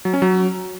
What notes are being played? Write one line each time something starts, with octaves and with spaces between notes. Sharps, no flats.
F#3
C#4
F#3